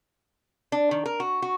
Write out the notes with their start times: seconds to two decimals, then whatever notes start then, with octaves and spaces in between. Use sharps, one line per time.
0.72 D4
0.91 D#3
1.06 A#4
1.20 F#4
1.42 F#4